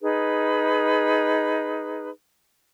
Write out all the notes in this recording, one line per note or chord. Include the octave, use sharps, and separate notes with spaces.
D#4 G#4 B4